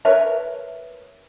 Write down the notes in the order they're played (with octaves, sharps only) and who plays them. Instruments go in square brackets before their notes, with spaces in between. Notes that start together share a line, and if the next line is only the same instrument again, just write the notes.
[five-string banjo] A#4 B4 C#5 E5 A#5